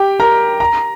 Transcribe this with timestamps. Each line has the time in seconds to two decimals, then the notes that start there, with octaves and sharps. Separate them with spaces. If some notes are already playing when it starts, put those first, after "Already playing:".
Already playing: G4 G5
0.20 A#4 A#5
0.60 A#5